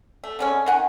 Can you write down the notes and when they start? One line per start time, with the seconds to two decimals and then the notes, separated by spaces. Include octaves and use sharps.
0.24 A3
0.39 D3 G#3 C#4
0.66 D#3 F#5 G#5